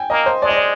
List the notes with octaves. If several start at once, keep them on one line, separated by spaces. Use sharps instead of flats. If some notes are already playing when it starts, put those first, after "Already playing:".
Already playing: G5 G#5
A#3 D#5
C5
G#3 D5
D#5
D5